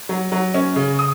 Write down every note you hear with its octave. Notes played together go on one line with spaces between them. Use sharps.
F#3
F#3
C#4
C#3
D#6